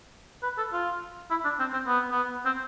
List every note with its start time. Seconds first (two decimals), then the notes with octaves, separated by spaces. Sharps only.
0.43 B4
0.58 A4
0.72 F4
1.31 E4
1.44 D4
1.59 C4
1.73 C4
1.87 B3
2.11 B3
2.45 C4